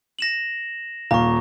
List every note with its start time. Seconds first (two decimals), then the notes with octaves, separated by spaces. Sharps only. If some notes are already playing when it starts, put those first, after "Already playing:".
0.19 A#6 E7 F#7
1.11 D#1 F5 A#5 C#6